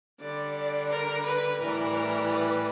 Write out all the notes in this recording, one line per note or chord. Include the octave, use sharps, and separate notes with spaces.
D3 G3 D5
A#4
B4
A2 E3 G3 A#4
A#4
B4